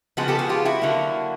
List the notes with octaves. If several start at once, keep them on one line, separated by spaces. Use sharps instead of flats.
C#3 F3 G#3 B3 F#4 G#4
G4 A4
F#4 G#4
F4 G4
E4 F#4
D3 F#3 A#3